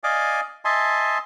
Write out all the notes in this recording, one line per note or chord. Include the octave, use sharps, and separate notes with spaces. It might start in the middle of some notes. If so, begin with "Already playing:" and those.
D5 D#5 F5 G#5 D6
D#5 E5 G#5 A5 C6